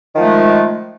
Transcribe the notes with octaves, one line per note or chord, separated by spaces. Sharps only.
D#3 F3 G#3 A3